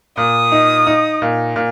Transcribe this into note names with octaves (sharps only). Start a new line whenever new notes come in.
A#2 D#6
D#4
D#4
A#2
A#2